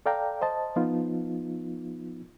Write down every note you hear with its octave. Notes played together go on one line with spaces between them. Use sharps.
A4 D5 F5 G5 A#5
C5 D#5 A5
F3 B3 D#4 F4